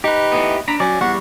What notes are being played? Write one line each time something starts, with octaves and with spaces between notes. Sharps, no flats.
D#4 G4 B4
A2 E3 B3
D4 A#5 B5
F#3 C#4 D5
E2 G3 F#5 C#6